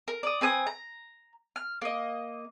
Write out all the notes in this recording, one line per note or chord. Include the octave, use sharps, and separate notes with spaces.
A#4
D5 D#6
C4 B4 G#5 D#6
A#5
F6
A#3 D#5